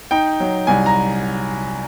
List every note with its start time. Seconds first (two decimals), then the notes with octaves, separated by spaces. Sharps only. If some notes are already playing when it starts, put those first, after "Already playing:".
0.11 D#4 G5
0.40 F#3
0.67 C2 G#5
0.86 A#5